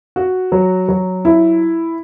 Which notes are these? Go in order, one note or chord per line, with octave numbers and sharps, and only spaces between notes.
F#4
F#3
F#3
E4